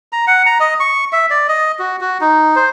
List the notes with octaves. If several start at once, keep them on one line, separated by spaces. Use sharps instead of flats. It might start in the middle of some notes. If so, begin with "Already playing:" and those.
A#5
F#5
A#5
D#5
C#6
E5
D5
D#5
F#4
F#4
D#4
C5